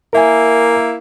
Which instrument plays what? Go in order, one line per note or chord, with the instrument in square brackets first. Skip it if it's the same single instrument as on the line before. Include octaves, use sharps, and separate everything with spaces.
[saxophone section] A#3 E4 [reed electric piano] A#4 E5 G#5